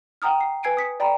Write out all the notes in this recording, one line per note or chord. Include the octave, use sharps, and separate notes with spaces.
F#5 G5 A#5 D#6 F6
C7
B4 G#5 G#6 C7 D7 D#7
D#6 B6 C#7
D5 G5 A#5 B5